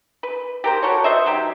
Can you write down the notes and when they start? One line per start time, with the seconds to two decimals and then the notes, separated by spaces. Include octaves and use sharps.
0.23 B4
0.64 G4 A#4 C5
0.83 F#4 A4 A#4 C#5
1.04 B4 C5 D#5 E5
1.26 F#3 D#4 G4